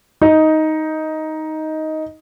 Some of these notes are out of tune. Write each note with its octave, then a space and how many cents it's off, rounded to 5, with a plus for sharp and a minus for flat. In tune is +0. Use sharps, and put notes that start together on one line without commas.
D#4 +10